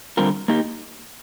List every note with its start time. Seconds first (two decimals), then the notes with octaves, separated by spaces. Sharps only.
0.17 D3 G3 C4 F4 A#4
0.48 A#3 D#4 G4